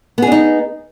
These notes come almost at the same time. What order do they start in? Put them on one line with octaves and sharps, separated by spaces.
B3 G#4 D4 D#4